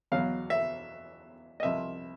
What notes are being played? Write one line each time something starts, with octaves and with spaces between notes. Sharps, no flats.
E2 B2 F#3 F5
E5
D#5
C2 C3 F3 E5